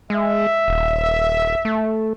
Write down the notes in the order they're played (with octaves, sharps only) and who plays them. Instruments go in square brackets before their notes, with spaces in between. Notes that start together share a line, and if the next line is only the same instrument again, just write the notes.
[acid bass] G#3 [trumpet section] E5
[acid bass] D#1
A3